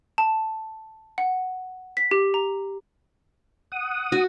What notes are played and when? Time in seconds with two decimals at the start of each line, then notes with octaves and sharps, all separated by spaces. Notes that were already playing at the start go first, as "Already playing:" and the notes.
0.18 A5
1.18 F#5
1.97 B6
2.11 G4
2.34 A#5
3.72 F#5 D#6
4.12 F#4